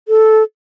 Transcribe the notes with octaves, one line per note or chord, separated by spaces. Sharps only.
A4